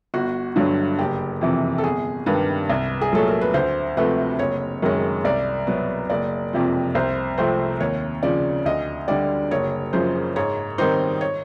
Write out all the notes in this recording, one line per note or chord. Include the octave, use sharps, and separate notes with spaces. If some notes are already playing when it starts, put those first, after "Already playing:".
G1 F#4
G2 D3 F#3
F#1 G4
F2 C3 E3
A4
G1 G#4
G2 D#3 G3 B4
C2
G#4
A#2 F#3 A3 A4
A#4
B4
D2 C5
C3 F3 A3 B4
F#1 C#5
F#2 D#3 G#3 C#4
C2 D5
B2 F#3 B3
F#1 D5
F2 C3 F3
C2 C5
C3 F3 A3 C4 C5
D#2 C#5
C#3 F3 D5
D2 D#5
D3 G3 D5
F#1 C#5
F#2 C#3 F3 C5
G#2 C#5
D#3 G3 C4 D#4 C5
C#5